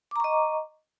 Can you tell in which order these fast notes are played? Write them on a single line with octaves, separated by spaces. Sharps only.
D6 A#5 C#6 D#5